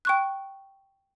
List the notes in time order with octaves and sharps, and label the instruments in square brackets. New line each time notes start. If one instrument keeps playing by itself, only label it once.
[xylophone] G5 C#6 F#6